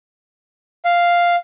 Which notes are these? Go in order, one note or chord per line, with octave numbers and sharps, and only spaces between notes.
F5